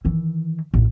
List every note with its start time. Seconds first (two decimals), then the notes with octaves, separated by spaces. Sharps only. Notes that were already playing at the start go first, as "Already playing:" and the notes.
0.05 D#3 E3
0.74 A1 D#2